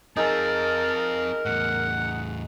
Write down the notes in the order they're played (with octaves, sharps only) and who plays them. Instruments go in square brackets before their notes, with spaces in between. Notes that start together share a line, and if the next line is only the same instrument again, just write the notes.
[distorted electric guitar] C4 F4 [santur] D#4 G#4 E6 [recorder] A#4 [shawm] A5
[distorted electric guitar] E2 A2 [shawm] F#5